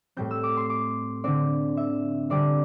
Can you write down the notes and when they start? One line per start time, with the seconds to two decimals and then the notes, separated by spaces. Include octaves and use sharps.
0.17 A2 G3 C4 G6
0.31 E6
0.43 D6
0.57 C6
0.70 D6
1.24 D3 C4 D5
1.77 E5
2.30 D3 G3 C4 D5